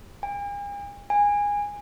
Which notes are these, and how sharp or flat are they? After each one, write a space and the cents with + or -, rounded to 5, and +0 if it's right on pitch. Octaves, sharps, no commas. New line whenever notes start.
G#5 -45
G#5 -20